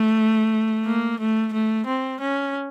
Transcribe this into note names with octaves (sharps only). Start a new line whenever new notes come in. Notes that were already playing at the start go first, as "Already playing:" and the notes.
Already playing: A3
A#3
A3
A3
C4
C#4